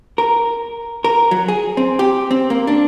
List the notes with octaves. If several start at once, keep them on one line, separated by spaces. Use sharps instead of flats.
A#4
A#4
F#3
G#4
C4
G4
C4
A#3
D4